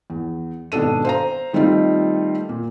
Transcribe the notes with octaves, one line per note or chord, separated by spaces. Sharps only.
E2
G#1 B2 D4 A4 D#7
C5 F5 A#5
D#3 G3 A3 C4 D#4 F4
A#2